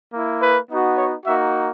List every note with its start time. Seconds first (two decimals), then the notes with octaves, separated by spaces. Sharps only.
0.12 A#3 E4
0.41 B4
0.70 B3 D#4 F#4
0.98 C#5
1.26 A#3 D#4 F#4 E5